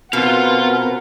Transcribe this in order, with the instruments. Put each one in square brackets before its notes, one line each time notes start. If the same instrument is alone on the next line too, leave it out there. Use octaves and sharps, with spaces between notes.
[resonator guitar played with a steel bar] B2 [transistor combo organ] C4 A#4 B4 [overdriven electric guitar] F4 F5 [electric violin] F#5